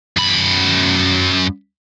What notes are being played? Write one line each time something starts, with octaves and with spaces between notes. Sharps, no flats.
F#2 B5